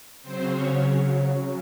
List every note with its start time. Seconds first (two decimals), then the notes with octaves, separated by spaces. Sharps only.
0.22 C#3 F#3 C4 C5
0.50 C#4 C#5